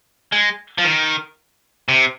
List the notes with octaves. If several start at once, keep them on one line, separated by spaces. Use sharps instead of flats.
G#3
F3
D#3
C3